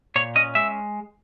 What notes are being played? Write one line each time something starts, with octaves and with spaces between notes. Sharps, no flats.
A#2 C#5
C#4 D#5
G#3 E5